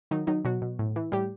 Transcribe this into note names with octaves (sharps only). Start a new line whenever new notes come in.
D#3 F#3 D#4
D#3 F#3 D#4
B2 F#3 F#4
B2
A2
E3
A2 G3 G4